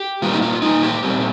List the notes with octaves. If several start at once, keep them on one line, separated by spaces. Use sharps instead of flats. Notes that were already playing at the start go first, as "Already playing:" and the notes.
Already playing: G4
A#2 G3 A#3 F4
D#4
F4
A#2 G3 A#3 D#4
G4
A#2 G3 C4